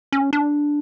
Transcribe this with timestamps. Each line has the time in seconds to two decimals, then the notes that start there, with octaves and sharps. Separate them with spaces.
0.12 C#4
0.33 D4